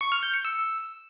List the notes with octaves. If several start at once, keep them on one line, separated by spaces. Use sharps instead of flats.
C#6
F6
G6
C#7
E6